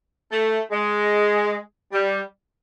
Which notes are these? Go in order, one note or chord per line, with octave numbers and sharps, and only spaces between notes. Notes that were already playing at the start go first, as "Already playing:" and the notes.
A3
G#3
G3